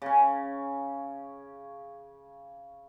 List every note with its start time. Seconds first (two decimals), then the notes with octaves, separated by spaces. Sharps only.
0.02 C#3 C#4